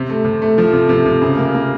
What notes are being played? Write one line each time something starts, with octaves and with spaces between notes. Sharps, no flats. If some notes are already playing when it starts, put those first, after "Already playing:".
Already playing: C3
A3
C3
A3
F3
C3
C3
C3
C#3
A#3
A#3